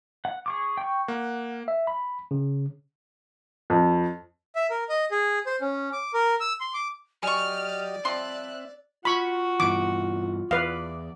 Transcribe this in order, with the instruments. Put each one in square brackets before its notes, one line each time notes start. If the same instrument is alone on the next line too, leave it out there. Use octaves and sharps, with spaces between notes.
[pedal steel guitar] F#5
G#4 C#6 D6
G5 C#6
[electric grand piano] A#3 [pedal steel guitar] F#5
[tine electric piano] E5
B5
C#3
[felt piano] F2
[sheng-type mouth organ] E5
A#4
D#5
G#4
C5
C#4
D6
A#4
E6
C6
D6
[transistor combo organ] F#3 G4 D#5 [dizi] D5 [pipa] G#5 C#6 [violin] F6
[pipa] F3 G3 C6 [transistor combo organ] C4 E5 [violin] F#6
[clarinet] F4 [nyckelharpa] F#4 F#5 [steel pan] B5 C#6
[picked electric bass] G2 B2 E3 [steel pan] D6
[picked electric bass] E2 [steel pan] B4 F5 [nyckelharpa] D5